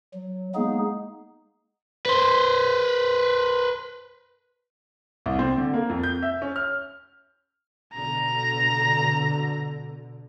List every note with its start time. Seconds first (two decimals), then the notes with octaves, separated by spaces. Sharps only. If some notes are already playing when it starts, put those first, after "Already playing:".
0.14 F#3
0.55 G#3 A#3 B3 D#4 G#4
2.06 B4 C5
5.26 C2
5.39 C4
5.58 D3
5.74 A#3
5.89 F2
6.03 G6
6.22 E5
6.42 C#4
6.56 F6
7.94 B2 D3 A#5